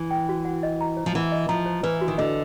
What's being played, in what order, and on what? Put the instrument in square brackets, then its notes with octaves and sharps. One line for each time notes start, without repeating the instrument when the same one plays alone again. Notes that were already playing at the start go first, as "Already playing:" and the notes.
Already playing: [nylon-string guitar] E3
[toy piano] G5
F#4
F#5
D#5
A#5
C5
[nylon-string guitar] F3
[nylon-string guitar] E3 [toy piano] F#5
[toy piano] D#5
[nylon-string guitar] F3 [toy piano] A#5
[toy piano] C5
[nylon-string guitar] E3 [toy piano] B4
[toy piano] F#4
[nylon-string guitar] D#3
[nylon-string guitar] D3 [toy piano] D#5